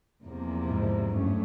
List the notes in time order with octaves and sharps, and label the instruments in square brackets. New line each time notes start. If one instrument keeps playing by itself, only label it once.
[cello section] E2 C3 F3 A#3
[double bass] G#2
[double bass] G2 [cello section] F#3 A3 C#4